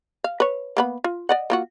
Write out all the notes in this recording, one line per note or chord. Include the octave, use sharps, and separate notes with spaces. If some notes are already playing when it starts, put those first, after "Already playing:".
F5
B4 C#5
A#3 B3 B5
F4
D5 D#5 F#5
A#3 F4 F#4